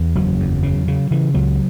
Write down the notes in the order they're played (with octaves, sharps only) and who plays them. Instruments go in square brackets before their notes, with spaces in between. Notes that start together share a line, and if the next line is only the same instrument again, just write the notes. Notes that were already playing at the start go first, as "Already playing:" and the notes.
Already playing: [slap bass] E2
F#1 F#3
E2
C#3
C#3
C#3 E3
C#2 F#3